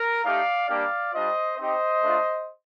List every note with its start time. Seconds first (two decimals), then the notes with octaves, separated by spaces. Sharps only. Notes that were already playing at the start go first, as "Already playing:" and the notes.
Already playing: A#4
0.25 A3 D#4 G4 D5 F5
0.69 G3 A#3 D4 G4 D5 F5
1.14 G3 D4 F4 C5 D#5
1.58 C4 D#4 G4 C5 D#5
2.02 A3 D4 F4